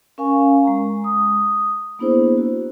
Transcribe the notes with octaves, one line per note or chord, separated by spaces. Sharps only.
C#4 A#4 F5 G#5 C#6
G#3 A#5
D#6
A#3 B3 D4 E4 G#4 C5
F#4